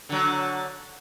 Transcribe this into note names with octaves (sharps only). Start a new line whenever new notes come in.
D3 F#3